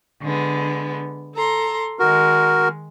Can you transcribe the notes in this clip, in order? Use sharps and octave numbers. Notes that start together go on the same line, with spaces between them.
D3 G#3 B3
A4 A#5 C6
D#3 G#3 F#4 A#4